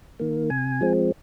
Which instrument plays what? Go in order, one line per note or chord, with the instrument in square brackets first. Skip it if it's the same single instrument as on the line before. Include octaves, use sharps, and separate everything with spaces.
[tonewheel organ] D#3 A#3
C3 G#5
F3 G#3 C4